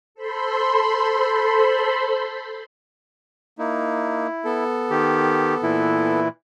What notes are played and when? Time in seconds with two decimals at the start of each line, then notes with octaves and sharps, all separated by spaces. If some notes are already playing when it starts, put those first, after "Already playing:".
0.15 A4 C5 B5 C6
3.59 A#3 D#4 E4
4.45 B3 A4
4.90 D#3 G4
5.63 A#2 E3 E4